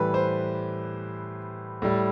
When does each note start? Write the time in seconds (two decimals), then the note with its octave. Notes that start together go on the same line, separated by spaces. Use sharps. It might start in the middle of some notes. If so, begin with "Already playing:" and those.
Already playing: A2 E3 G3 B4
0.14 C5
1.82 A2 G3